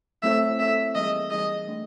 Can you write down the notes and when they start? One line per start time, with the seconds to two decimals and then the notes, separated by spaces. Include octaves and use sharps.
0.23 A3 C4 E4 A4 C#5 E5
0.59 A3 C4 E4 A4 C#5 E5
0.95 E3 G3 A#3 D#4 G#4 D#5
1.31 E3 G3 A#3 D#4 G#4 D#5
1.67 A3 D4